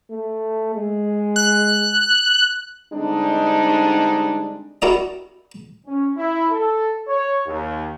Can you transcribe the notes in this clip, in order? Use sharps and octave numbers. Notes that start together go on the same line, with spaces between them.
A3
G#3
F#6
D3 G3 G#3 C4 D4 D#4
E4 F#4 G4 A#4 D5 D#5
C#4
E4
A4
C#5
D#2